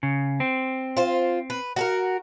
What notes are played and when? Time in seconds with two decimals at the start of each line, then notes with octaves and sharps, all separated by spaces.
0.03 C#3
0.40 C4
0.97 F4 C5
1.50 B4
1.76 F#4 A4 A#4